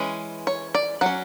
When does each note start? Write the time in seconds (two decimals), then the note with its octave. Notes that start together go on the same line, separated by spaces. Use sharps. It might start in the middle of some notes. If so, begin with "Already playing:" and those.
Already playing: E3 G#3 C#4
0.47 C#5
0.75 D5
1.01 F#3 C#4 F#5